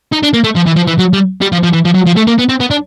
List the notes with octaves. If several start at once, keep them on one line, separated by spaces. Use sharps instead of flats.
D#4
D4
A#3
A3
F3
E3
F3
E3
F#3
G3
G3
F3
F3
E3
F3
F#3
F3
A3
A#3
B3
C4
B3
D4